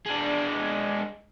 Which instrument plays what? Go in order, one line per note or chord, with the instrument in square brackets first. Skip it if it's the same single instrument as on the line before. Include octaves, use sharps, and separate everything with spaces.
[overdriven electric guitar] G#3 D4